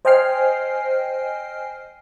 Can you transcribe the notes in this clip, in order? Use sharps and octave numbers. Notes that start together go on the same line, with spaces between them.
C5 D#5 G5 G#5 F6 C7